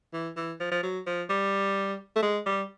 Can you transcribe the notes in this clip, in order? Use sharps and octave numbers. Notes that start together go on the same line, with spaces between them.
E3
E3
F3
F3
F#3
F3
G3
A3
G#3
G3